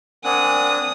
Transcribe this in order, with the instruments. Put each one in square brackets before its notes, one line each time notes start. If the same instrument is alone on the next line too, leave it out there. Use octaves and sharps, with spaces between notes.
[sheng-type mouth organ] C4 D4 F#6 [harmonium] A#4 F#5 G#5 [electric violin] D#6